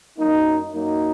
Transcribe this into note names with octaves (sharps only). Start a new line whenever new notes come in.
F#2 F#3 A#3 D#4
F#2 F#3 A#3 D#4